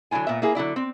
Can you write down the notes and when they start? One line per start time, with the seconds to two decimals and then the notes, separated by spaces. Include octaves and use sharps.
0.11 D3 F#3 D4 E4 F4 G#5
0.27 A#2 B3 E5
0.42 A#3 E4 G#4
0.55 D3 F#3 E4 D5
0.76 C4